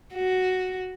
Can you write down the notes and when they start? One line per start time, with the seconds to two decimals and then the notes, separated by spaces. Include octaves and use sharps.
0.15 F#4